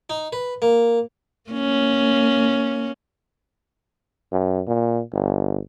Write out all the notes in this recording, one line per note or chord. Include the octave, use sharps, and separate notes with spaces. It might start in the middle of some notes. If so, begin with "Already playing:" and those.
D#4
B4
A#3
A#3 C#4
F#2
A#2
G1